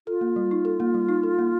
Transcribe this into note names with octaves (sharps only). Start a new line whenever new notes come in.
F4 A4
A#3
G3
D#4
A4
A#3
G3
D#4
A4
A#3